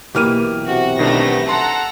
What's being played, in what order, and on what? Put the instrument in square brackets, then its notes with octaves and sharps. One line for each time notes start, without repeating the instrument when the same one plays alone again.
[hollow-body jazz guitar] B1 E3 A#3 [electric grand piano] G4 F6 D#7
[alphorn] C3 [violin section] F#4
[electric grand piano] B2 D#3 D4 [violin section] A3 B3 A#6
[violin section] A4 F#5 A#5 [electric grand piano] C6